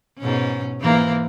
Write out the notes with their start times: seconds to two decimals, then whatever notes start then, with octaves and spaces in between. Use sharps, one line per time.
0.19 G#2 B2 C#4
0.80 G#2 E3 A#3